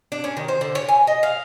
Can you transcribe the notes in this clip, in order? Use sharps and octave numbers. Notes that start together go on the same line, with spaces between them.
D4
C#4
D#3
C5
D3
C#5
G#5
D#5
F5